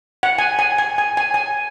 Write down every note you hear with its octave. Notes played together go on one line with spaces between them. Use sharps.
F#5
G#5
G#5
G#5
G#5
G#5
G#5